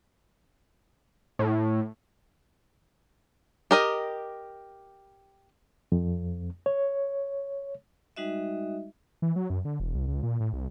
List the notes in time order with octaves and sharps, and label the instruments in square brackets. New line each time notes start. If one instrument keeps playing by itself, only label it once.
[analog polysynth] A2
[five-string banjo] G4 A#4 D#5
[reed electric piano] F2
C#5
[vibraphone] G3 G#3 D#4 F#4 D#5 E5
[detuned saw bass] E3
F#3
F#2
D3
E1
C2
C#2
A#2
A2
C2